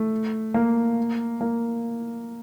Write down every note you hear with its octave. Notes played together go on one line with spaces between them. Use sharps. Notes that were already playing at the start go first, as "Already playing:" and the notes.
Already playing: A3
A#3
A#3